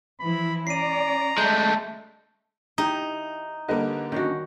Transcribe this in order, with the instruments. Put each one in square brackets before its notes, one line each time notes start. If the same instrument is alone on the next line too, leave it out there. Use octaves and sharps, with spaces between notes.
[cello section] E3 F3 E4 [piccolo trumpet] B5
[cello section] C#4 D5 [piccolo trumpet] A#5 [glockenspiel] C7 D#7
[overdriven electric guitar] G#3 A3 [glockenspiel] G6
[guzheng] D#4 [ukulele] E4 G4 A#5
[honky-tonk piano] D3 G3 A#3 [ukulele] B4 D#5 A5
[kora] D#3 F#4 [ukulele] C#4 D4 D#5